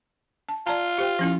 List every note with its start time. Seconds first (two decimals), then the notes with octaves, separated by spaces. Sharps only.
0.49 A5
0.67 F4 D5 A5 A#5
0.98 G4 C5 G5
1.19 F3 C#4 E4